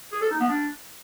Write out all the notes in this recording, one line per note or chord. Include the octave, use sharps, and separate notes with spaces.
G#4
A4
D#4
B3
D4